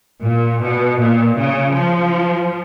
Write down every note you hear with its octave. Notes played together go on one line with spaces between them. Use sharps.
A#2
B2
A#2
C#3
F3